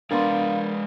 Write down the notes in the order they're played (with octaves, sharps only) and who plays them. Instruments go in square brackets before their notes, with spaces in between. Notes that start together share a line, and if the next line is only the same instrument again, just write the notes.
[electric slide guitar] G#3 D5 [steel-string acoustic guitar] B3 A#4 [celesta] D4 B5 C6 [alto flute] F5